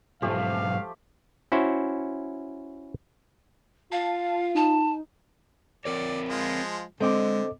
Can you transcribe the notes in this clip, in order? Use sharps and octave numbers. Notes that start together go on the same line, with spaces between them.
B1 G#2 F3 A3 G4 F5
C#4 E4 F#4 C5
F4 F5 A5
D#4 A5
C4 A#4 C#5 D5
F3 G#3 F4
D3 G#3 C4 A4 D#5 G5 D6